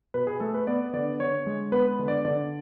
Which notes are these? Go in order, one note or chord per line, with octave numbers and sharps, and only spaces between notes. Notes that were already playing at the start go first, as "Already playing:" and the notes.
B2 B4
G#4
A3 A4
B4
B3 D5
D3 D5
D3 C#5
G#3
B3 B4
D3
D5
D3 D5